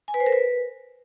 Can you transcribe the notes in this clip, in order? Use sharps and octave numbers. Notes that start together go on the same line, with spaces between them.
G#5
B4
C5
A#4
B4